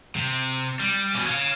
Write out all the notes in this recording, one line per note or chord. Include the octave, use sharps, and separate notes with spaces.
C3
G3
B2 C#4
C#5 F5